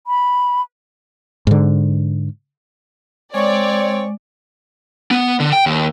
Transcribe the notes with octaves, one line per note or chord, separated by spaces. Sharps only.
B5
G#2 D3
G#3 C4 C#5 D5
B3
D3
G5
D#2